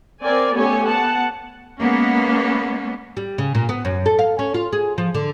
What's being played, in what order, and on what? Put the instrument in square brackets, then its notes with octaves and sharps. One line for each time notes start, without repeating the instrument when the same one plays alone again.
[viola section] C4 A#4 D5 G#5
A3 B3 C#4 G4 C#5 G#5
B3 F#5 A5
[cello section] G#3 A#3 B3 C#4
[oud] G3
C#3
A#2
B3
F#2
A4
F5
C#4
F4
G#4
F3
D3